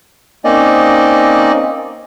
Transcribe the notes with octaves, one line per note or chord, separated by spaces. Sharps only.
A#3 C4 C#4 D#4 D5 D#5